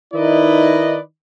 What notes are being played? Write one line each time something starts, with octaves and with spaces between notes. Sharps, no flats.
D#3 D#4 E4 B4 D5 D#5